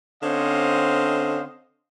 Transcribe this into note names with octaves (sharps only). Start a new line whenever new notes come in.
D3 C4 C#4 C5 D#5 F5